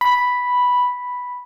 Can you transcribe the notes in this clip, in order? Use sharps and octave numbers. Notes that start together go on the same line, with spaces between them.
B5